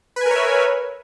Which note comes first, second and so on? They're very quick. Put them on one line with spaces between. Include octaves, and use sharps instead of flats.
B4 G#5 A#4 C#5 E5